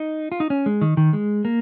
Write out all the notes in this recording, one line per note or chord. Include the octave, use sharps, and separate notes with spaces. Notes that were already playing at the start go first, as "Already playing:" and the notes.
Already playing: D#4
F4
D#4
C#4
G#3
D#3
D#3
G#3
A#3